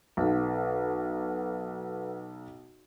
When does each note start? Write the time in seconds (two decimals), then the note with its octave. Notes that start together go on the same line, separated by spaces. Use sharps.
0.17 B1 A4 B4 F#5